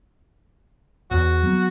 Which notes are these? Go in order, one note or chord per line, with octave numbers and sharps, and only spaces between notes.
E2 F#4
F#3 B3